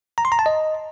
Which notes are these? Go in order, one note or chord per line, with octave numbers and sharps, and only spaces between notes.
A#5
C6
A#5
A5
D#5